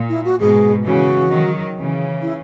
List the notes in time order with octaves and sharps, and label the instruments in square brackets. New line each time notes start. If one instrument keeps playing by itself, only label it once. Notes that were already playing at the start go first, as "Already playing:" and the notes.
Already playing: [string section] A#2
[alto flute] E4
F#4
[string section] G#2 B2 [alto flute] G#4
[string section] C#3 E3 [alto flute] F#4
[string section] D#3 F#3
C#3 E3
[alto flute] E4